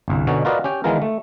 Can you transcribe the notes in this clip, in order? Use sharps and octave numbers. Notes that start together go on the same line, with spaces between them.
G1 C2
B2 D3 C#4 D#4 F#4
F4 F#4 A#4 B4 D5 D#5
C#4 G4 G5
D#3 E3 G#3 B3 F4 A#4
A3